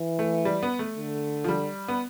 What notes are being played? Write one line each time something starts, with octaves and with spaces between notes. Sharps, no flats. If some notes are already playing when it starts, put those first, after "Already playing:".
Already playing: E3
A3
G3
B3
A3
D3
F3
G3
B3